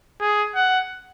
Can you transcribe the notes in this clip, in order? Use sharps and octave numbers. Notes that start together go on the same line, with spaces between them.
G#4
F#5